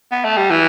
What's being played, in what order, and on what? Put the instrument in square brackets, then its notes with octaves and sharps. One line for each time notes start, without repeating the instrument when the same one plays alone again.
[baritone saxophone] B3
A3
G3
E3